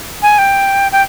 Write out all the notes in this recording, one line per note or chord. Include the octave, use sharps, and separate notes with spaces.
G#5
G5
G5